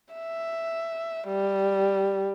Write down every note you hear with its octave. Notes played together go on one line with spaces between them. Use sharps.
E5
G3